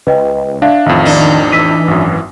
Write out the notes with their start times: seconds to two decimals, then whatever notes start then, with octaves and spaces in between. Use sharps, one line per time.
0.07 C#2 B4 D#5 G5
0.62 D4 E5 F5
0.86 A1 F2 D#3
1.05 D4 D#4
1.52 E3 E6 B6 D#7
1.88 G#1 F#2